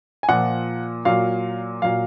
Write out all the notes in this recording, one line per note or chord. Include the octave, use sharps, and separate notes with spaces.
G#5
A#2 F3 F#5
A#2 F#3 F5
A#2 F#3 F5